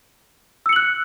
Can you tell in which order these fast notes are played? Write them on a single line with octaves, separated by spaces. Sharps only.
E6 C#7 F#7 F#6